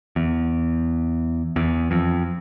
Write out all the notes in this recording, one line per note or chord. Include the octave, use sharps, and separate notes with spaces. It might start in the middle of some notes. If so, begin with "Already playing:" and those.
E2
E2
F2